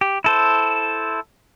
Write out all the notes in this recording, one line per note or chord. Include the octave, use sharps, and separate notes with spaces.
G4
E4 A4 C5